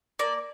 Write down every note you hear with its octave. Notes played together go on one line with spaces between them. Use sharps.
A#3 D5